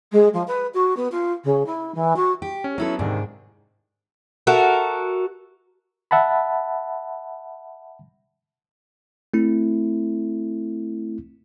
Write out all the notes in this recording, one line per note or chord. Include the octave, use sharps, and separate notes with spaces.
G#3
F3
B4
F#4
B3
F4
C#3
E4
E3
F#4
G4
C#4
F#3 B3 C#4 E4 A4
D2 G#2 C3 D#3 D4
F#4 A4 A#4 E5
E5 F#5 A5 B5
A3 C4 E4